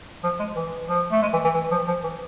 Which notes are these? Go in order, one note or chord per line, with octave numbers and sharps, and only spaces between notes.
F3
G#3
E3
F3
A3
G#3
E3
E3
E3
F3
F3
E3